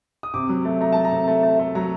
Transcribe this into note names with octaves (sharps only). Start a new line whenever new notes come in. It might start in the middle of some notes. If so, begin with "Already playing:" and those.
D#6
C3 D6
F#3
A3
A3 A#5
A3 A5
A#5
C3
A3
A3
A3
F#3 A#5